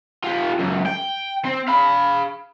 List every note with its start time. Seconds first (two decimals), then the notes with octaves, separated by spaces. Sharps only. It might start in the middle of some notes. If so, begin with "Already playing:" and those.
0.24 F4 G4
0.59 C#2 F#2
0.86 G5
1.45 C4
1.68 F5 B5